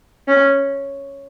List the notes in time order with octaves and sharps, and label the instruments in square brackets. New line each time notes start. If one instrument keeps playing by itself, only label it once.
[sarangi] C#4